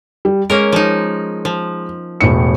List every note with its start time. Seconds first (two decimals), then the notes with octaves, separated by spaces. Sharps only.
0.25 G3
0.50 G#3 A#3 C#4 A#4
0.72 F3 D#4
1.45 F3
2.21 E1 A2 C#7